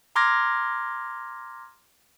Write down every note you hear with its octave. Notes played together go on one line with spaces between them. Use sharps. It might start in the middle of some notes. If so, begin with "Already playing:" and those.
A#5 C6 D6 F6 G#6 A#6